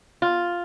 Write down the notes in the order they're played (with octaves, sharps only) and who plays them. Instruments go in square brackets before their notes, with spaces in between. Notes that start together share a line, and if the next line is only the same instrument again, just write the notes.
[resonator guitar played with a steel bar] F4